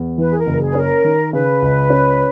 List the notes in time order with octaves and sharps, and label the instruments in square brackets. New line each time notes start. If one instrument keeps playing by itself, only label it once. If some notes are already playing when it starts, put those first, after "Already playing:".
Already playing: [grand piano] E2
[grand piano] E3 [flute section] B4
[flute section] G#4
A#4
[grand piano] F#1
[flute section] G#4
B4
[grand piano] C#4 [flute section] A#4
[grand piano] D#3
[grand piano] C#3 [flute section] B4
[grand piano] C#2
C#4